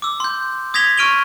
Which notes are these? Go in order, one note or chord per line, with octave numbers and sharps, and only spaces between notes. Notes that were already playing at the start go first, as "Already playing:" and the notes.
D6 E6
C6 G6
D#6 G#6 A#6 B6 F7 G7
C#6 F6 D7 D#7 F7 G7